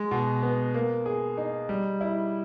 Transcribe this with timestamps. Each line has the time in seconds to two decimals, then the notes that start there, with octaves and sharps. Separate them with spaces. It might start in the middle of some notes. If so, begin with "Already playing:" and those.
Already playing: G#3
0.11 B2
0.43 B3
0.74 A#3
1.06 G#4
1.37 D#4
1.69 G3
2.01 E4